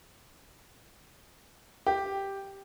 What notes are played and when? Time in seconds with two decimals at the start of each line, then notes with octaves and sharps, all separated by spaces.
1.87 G4